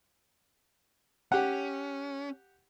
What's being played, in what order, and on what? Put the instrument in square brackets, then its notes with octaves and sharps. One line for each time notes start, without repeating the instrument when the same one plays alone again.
[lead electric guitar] C#4 [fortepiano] G4 F#5